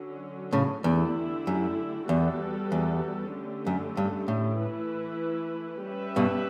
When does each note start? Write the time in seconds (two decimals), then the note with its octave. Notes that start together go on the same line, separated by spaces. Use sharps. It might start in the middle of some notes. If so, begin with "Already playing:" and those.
Already playing: D3 F#3 C#4
0.53 A2 C#3
0.84 E2 D3 A3 E4 G4
1.47 F#2
2.09 E2 G3 B3 F#4 A4
2.72 E2
3.34 D3 A3 C#4 G4
3.67 F#2
3.97 G2
4.28 A2
4.60 E3 A3 E4 B4
5.85 G3 C#4 G4 B4 E5
6.16 G2 B2